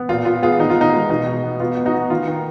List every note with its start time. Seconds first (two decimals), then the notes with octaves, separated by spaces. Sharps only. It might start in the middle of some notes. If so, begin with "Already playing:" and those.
Already playing: B3
0.09 A#2 F4
0.25 B3 F4
0.42 B3 F4 G#4
0.59 D#3 D#4
0.70 F4
0.76 B3
0.81 D#4
0.93 G#3
1.09 B2 D#4
1.27 B2
1.43 B3
1.60 B3 F4
1.77 B3
1.85 D#4 F#4
1.94 B3
2.10 D#3 F4
2.27 D#3